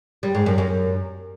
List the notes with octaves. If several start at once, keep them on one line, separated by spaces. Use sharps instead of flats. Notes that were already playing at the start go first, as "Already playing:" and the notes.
G3
G#2
F#2
F#2